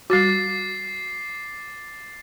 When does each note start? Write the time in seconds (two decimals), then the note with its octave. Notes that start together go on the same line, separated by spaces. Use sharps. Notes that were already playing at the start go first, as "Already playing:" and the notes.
0.10 G3 F#4 D6 A6 C7